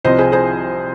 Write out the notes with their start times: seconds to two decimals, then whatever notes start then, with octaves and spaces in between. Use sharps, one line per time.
0.04 C2 C3 F3 C4 C5 D#5
0.18 G#4 C5
0.32 G#4 C5